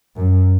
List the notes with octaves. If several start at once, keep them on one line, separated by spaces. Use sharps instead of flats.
F#2